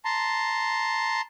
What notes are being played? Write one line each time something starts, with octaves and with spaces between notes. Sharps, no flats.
A5 A#5 C6